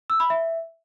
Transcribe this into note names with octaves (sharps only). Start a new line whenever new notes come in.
E6
B5
E5